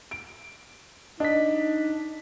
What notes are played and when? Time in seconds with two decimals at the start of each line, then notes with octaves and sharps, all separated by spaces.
0.11 D7
1.20 D4 D#4 D#5 B6